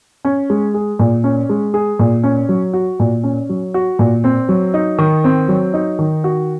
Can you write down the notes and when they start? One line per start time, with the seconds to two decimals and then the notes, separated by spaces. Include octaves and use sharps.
0.25 C#4
0.50 G#3
0.74 G#4
0.99 A#2
1.24 C#4
1.49 G#3
1.74 G#4
1.99 A#2
2.23 C#4
2.49 F#3
2.73 F#4
2.99 A#2
3.24 C#4
3.49 F#3
3.74 F#4
3.99 A#2
4.24 C4
4.49 F#3
4.74 D#4
4.98 D#3
5.24 C4
5.48 F#3
5.74 D#4
5.99 D#3
6.24 F#4